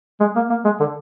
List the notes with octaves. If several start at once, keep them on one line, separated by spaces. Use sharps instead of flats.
G#3
A#3
A#3
G#3
D3